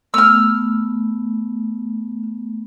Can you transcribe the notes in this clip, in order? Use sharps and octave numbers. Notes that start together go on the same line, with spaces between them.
A3 B3 E6 F6